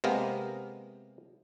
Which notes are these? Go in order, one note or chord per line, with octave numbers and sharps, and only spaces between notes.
C3 G#3 A#3 B3 A#4